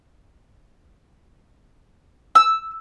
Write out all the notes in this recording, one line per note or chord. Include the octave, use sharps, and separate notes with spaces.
E6